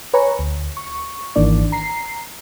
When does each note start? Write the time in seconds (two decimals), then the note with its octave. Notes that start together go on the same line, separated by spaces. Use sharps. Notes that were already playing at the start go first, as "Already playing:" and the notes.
0.14 B4 C#5 G#5 A#5 C#6
0.39 D2
0.77 C#6
1.36 G#1 D#3 E3 A#3 D4 D5
1.72 A#5 C7